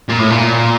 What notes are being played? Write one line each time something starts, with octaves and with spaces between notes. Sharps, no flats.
A#2
A2
A#2